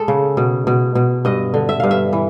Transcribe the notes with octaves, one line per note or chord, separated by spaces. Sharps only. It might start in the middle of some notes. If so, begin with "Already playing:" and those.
Already playing: G#3 A4
C#3
B2
B2
B2
G2 D#5
D3
E5
G2 F5
E5
E3